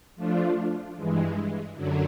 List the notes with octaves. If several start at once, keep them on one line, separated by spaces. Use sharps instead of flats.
F3 A3 D4 F4
G2 E3 G#3
F#2 D3 F#3